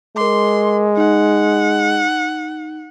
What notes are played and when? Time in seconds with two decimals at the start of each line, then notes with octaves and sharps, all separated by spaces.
0.17 G#3 A#4 C6 D6
0.97 D#4 F#5